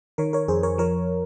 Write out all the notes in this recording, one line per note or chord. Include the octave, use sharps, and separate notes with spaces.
D#3 A#4 C#5
A#4 C#5
F2 G#4 C5
A#4 C#5
F3 A#4 C#5